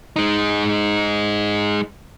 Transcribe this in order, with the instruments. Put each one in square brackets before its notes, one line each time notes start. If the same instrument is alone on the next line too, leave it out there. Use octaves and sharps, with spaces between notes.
[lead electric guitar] G#3 D#4